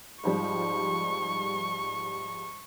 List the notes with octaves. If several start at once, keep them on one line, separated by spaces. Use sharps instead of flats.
G#2 F3 G3 C#6